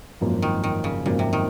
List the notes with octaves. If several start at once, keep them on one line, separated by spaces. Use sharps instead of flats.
G#1 F#2 F3 A#3
D#3
D#3
C#3
G#1 F#2 A#2 F3 A#3
C3
D#3